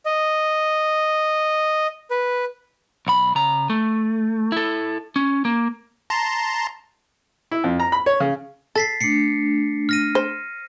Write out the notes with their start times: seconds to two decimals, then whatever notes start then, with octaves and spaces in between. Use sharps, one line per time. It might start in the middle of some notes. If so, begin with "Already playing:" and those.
0.06 D#5
2.11 B4
3.07 B1 B5
3.35 C#3 A#5
3.70 A3
4.52 E4 A4
5.16 C#4
5.45 A#3
6.10 A5 A#5 C6
7.51 E4
7.64 F2
7.79 A#5
7.92 B5
8.06 C#5
8.20 C#3
8.76 A4 A6 B6 C7
9.01 A3 D4 C7 C#7
9.89 F6 A#6 D#7
10.15 C5